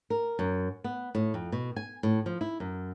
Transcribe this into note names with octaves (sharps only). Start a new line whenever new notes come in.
A#4
F#2
B3
A2
F2
B2
G#5
A2
F3
E4
F#2